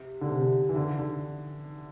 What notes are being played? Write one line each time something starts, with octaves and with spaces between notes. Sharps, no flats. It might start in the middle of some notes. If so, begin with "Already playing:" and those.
Already playing: C3
D3
C3
C3
E3
D3
D3